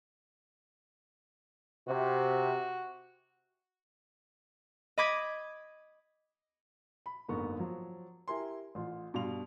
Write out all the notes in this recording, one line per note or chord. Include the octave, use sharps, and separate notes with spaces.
C3 F#4
D#5 B5 D6 D#6 G#6 B6
B5
F#1 G#2 D3 B3 A#4 C#6
F3 F#3
E4 G4 A#4 G#5 C6
A1 F4 C6
G2 B2 G3 F5 C6 F7